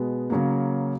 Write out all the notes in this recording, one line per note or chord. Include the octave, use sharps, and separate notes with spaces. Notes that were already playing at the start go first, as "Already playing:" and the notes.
Already playing: B2 G#3 B3
C#3 F#3 A#3